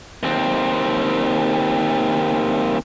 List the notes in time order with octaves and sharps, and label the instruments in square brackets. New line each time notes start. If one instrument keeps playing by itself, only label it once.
[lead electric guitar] D#2 C4